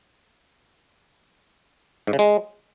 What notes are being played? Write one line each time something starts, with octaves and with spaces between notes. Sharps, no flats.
G#2
C#3
G#3